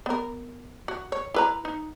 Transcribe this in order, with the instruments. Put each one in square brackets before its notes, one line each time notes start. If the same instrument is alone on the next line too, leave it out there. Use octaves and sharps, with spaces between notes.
[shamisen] B3 A#4
F#4
C#5
E4 B4 A#5
D#4